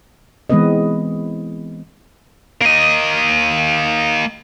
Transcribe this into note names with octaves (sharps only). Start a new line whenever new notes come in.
E3 G#3 B3 C4 B4 D#5
A#3 D#5